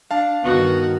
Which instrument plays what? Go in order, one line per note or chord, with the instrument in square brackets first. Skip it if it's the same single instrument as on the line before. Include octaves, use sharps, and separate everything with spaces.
[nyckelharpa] D4 [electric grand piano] F5 A5
[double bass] G2 D#3 [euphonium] B3 [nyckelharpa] F#4